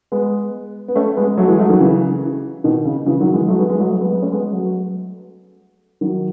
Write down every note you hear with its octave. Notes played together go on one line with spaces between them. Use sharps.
G#3 B3
B3
A3 C#4
G#3 B3
F#3 A3
E3 G#3
F#3 A3
D#3 F#3
C#3 E3
B2 D#3
C#3
C#3 E3
D#3 F#3
E3 G#3
F#3 A3
G#3 B3
G#3 B3
F#3 A3
F#3 A3
G#3 B3
G#3 B3
A3 C#4
G#3 B3
F#3 A3
D#3 F#3